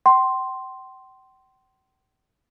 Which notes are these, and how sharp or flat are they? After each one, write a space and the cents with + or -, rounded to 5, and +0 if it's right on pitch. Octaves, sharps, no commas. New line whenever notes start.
G5 -40 C6 +0